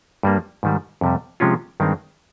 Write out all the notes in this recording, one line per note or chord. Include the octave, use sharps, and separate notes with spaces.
G2 G3 A#3
G#2 D#3 G3
F2 C3 G3
C3 F3 G#3 C#4 F4
G2 D#3 G#3 C4